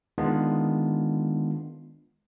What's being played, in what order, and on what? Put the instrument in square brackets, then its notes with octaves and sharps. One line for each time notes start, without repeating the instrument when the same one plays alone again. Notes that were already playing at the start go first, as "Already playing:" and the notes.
[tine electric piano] D#3 G#3 B3 D4 F4